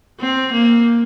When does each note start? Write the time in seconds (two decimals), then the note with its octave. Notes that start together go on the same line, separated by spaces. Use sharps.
0.20 C4
0.53 A#3